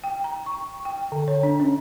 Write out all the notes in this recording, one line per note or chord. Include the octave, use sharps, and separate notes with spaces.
G5
A#5
C#6
G5
D3
C#5
D4
C#4